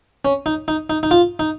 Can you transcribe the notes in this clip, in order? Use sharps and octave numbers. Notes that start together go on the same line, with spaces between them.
C#4
D#4
D#4
D#4
D#4
F4
D#4